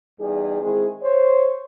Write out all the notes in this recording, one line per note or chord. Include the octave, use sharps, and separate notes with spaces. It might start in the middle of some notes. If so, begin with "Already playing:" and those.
E2 G3 D#4 G#4
D#3 G#3 C4 E4 G#4
C5 C#5